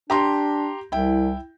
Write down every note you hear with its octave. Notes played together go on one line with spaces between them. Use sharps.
D4 G4 A#5 C6
C2 E4 G5